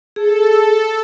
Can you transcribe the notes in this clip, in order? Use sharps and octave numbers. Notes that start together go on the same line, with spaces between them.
G#4 A4